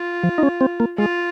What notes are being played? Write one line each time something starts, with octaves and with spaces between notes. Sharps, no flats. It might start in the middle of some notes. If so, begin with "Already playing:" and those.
Already playing: F4
F3
D#4
C#4
C4
A#3
G#3 F4